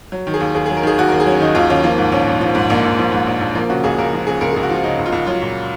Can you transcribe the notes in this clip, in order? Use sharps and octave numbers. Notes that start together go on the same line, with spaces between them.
F#3
D#3
G#4
D#2
D#2 G#4
G#4
F#3
A#4
D#3 G#4
D#2 F#4
A#4
D#2
G#4
F#3 C#4
D#3 D#4
D#2 F4
D#2 C#4
F3 A#3
G#2
A#1 C#4
A#1
F3
G#2
A#1 A#3
A#1
F3
G#2
A#1
A#1
F3 A#3
C#3 F#4
C#2 G#4
C#2 A#4
F3
C#3 G#4
C#2 A#4
G#4
C#2
F#4
F3 F4
C#3 D#4
C#2
F4
C#2
F#3 F4
A#2